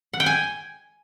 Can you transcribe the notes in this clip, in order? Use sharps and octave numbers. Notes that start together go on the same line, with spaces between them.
F#5
G5
G#5